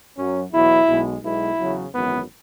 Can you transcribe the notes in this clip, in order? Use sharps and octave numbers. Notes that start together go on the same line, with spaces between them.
F#2 F#3 C#4
E2 B2 F#3 E4
B1 B2 G#3
B1 B2 G#3 E4
E2 C#3 F#3
G#1 F#2 E3 B3